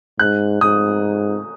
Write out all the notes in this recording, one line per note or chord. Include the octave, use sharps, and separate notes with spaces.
G#2 F#6
G#2 D#6